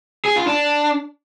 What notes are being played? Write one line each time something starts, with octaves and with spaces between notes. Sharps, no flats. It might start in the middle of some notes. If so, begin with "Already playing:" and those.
G#4
F4
D4